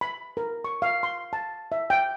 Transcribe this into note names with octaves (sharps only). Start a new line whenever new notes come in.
B5
A#4
C#6
F5
C6
A5
E5
G5